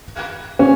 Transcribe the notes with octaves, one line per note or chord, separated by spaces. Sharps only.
C#4